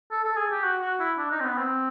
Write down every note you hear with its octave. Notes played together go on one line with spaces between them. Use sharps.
A4
A4
G#4
G4
F#4
F#4
E4
D4
D#4
C4
B3
C4